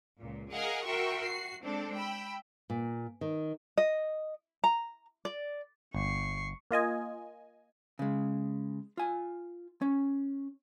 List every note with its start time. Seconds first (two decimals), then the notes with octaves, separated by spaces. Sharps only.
0.19 C#2 A#2
0.51 G#4 A#4 D#5 F5 F#5 G#5
0.85 F#4 A#4 E5 G5 C6 C#6
1.23 F#4 C7
1.63 G#3 C4 D4 A4
1.95 G5 B5 E6
2.70 A#2
3.21 D#3
3.78 D#5
4.64 A#5
5.25 D5
5.94 G1 C#6 C7
6.71 A#3 F4 D#5 G#5
7.99 C#3 G#3
8.97 F4 G#5
9.81 C#4